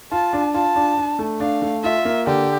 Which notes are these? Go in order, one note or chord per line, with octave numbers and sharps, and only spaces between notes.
F4 A5
D4
F4 A5
D4
D4
A3
D4 F5
A3
F4 E5
A#3
D3 G4